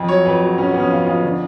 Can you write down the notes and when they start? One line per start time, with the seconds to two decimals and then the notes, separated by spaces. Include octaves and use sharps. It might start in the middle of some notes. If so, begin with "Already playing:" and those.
Already playing: F2
0.08 F#3 C#5
0.26 F2 B4
0.42 F#3
0.58 F2 C#4
0.69 B3
0.75 F2 C#4
0.91 F2 F4
1.06 F2 F4
1.23 D3